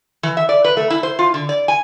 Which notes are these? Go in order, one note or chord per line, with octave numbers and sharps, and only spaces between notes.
E3
E5
D5
B4
A3
E4
C5
F4
D3
D5
G#5